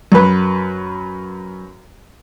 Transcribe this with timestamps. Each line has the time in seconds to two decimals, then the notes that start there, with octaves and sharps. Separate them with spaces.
0.12 F#2 B4